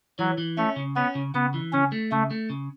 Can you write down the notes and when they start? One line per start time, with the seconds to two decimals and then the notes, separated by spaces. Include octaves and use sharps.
0.19 E3 F#3
0.38 E3
0.57 A3 C#4
0.76 C#3
0.96 B3 C#4
1.15 C#3
1.34 C#3 B3
1.54 E3
1.73 C#3 C#4
1.92 A3
2.12 C#3 A3
2.30 A3
2.50 C#3